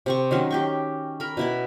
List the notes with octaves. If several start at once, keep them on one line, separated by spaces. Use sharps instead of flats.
C3 C4 C#6
D#3 F#3 C#4
G4 G5 C#6
A#4 B5
B2 E4 B5